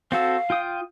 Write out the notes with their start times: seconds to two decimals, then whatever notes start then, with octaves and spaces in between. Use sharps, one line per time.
0.12 C4 F#4 A4 F5
0.50 F4 G5 D#6